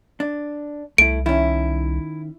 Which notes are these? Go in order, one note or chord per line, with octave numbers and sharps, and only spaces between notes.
D4
C2 A3 E4 D7
D#3 C#4 E4